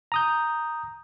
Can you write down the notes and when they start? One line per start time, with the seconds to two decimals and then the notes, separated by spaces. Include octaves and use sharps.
0.12 A#5 D#6 G6